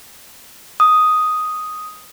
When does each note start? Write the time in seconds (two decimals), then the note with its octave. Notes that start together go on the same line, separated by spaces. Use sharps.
0.80 D#6